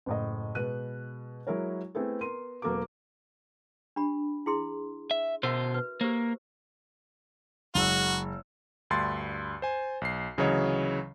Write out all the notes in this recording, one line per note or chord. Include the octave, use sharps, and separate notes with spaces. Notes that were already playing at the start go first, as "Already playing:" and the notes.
F#1 A2 D#5
B2 G#3 B4 F#6 D#7
F#3 G#3 E4 A#4 C#5
A3 B3 C4 E4 G#4 A4
B3 A#4 C6 D#7
E1 F#3 A#3 A4 B4 D6
D4 G4 B5
E4 G#4 C6
E5
B2 F#4 A#4 C5 E5
B4
A#3 G4 A#4 C5
F#1 G#3 F#4 E6
D2 G2 C6 A6
C5 G#5
B1 C7
D2 C#3 E3 F#3 C#5 D#5